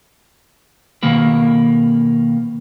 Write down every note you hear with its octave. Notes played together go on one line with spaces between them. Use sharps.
B2 D#3 A#3 A#4 B4